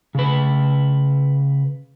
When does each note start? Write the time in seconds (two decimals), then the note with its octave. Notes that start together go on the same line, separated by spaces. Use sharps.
0.15 C#3 B4